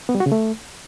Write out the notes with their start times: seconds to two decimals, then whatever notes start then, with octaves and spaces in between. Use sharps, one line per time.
0.09 B3
0.15 G3
0.20 F#4
0.26 C#3
0.32 A3